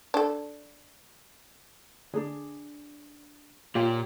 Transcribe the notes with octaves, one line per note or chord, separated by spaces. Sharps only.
D4 A4
D3 D4 D#4 G#4
A#2 F4 G4 C#5 G5